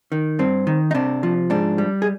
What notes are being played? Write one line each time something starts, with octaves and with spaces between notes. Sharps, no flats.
D#3
G2 C4
D#3
D#4
C3 D4
F3
G#2 D4
G3
G#4